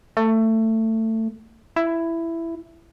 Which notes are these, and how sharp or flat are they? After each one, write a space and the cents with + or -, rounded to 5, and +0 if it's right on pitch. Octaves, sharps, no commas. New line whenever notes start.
A3 +20
E4 +10